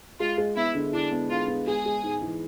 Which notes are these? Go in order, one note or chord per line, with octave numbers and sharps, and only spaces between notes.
G#3 F4
G#3
B3 E4
D3
D4 E4
B3
D3 F4
B3
G#3 G#4
G#3
G#2
E3